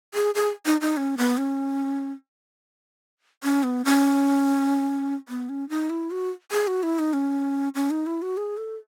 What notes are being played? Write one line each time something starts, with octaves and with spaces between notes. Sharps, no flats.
G#4
G#4
D#4
D#4
C#4
B3
C#4
C#4
B3
C#4
B3
C#4
D#4
E4
F#4
G#4
F#4
E4
D#4
C#4
C#4
D#4
E4
F#4
G#4
A4